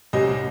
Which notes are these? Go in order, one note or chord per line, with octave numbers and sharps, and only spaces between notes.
C2 C3 G3 C#4 D#5